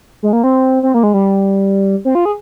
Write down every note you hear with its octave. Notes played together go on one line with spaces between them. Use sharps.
G#3
A#3
C4
C4
A#3
G#3
G3
C4
F4
G#4